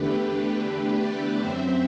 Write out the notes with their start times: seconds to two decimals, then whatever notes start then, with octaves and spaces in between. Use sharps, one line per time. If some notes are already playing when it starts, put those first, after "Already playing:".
Already playing: E2 D3 A3 D4 G4 B4
0.15 G4 B4
0.97 B4 D5
1.38 F#2 F#3 C4 C5 E5